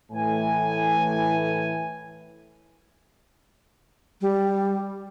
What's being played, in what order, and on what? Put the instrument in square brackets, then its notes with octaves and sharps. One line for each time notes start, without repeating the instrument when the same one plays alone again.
[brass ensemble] A2 E3 G#5
[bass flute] G3